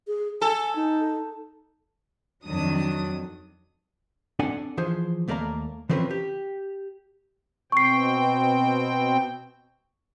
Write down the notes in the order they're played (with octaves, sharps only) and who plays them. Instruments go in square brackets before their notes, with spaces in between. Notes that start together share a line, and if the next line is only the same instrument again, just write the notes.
[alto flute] G#4
[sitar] A4 [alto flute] G#5
[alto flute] D#4
[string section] F2 D#3 F#3 D4 D#6
[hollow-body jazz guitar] C4 D4 A4 D5 F#5 G#5
E3 F3 G#4 C5
D#2 A3 A#3 A#4 D5 A#5
E3 F3 C4 C#4 A#4 B4
G4
[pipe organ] B2 C4 G5 [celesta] C#6 C7